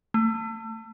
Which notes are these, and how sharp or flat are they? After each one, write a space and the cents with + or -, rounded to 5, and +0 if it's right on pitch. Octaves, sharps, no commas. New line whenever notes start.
A3 +30